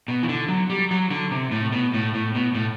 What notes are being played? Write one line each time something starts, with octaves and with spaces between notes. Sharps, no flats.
B2
E3
D3
F#3
G3
F#3
D3
C3
A2
B2
A2
A2
B2
A2